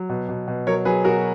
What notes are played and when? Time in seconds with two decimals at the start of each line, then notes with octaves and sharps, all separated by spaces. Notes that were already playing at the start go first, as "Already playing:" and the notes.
Already playing: F#3
0.09 B2
0.29 B2
0.47 B2
0.67 F#3 A#4 C#5
0.85 F#3 G#4 B4
1.04 B2 F#4 A#4